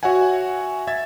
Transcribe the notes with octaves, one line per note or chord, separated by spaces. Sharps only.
F#4 C#5 E5 F#5 G#5
E5 G#6 A6